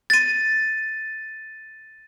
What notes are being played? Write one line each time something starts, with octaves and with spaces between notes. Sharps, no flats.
A6 D#7